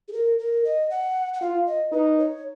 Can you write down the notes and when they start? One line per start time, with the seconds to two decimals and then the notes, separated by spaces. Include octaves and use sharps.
0.08 G#4
0.13 A#4
0.39 A#4
0.65 D#5
0.90 F#5
1.34 F#5
1.41 F4 F5
1.66 D#5
1.92 D#4 B4
2.19 C#5